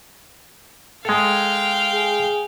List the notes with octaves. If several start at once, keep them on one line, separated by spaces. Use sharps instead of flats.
G#3 A4 F5 G5
G#4